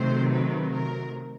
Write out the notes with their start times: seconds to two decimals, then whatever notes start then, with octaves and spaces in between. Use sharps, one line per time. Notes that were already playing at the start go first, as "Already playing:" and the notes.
Already playing: C3 D#3 F#3 A3 C4 C5
0.31 B4
0.72 A#4